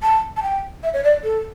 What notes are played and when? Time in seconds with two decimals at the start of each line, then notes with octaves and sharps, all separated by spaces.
0.03 A5
0.37 A5
0.43 G5
0.83 E5
0.94 C#5
1.04 D5
1.24 A4